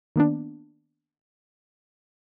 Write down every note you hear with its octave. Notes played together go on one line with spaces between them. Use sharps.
D#3 A#3 B3 D4